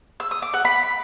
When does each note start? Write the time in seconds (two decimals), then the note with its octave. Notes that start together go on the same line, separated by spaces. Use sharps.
0.20 E6
0.31 D#6
0.42 D6
0.54 F#5
0.65 B5